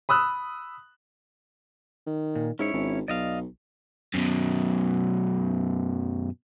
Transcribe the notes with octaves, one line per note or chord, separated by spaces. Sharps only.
B5 D#6 E6 F#6
D#3
A#2
G#2 C#4 E4 C#5
G#1
B1 D5 D#5 F5
F#2 B2